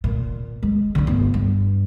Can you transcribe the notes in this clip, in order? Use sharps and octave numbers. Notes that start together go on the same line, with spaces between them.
A#2
G#3
D3 D4
G1
G2